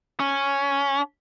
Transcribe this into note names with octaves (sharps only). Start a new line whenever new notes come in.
C#4